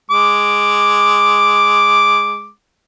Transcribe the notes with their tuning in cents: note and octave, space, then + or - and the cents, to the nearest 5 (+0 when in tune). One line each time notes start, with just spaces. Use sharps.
G#3 -5 D6 +0